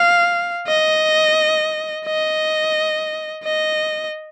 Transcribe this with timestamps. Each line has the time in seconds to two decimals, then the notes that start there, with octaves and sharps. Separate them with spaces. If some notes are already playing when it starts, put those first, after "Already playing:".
Already playing: F5
0.68 D#5
2.06 D#5
3.44 D#5